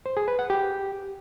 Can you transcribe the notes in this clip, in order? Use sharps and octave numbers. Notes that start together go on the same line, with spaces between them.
C5
G#4
B4
F#5
G4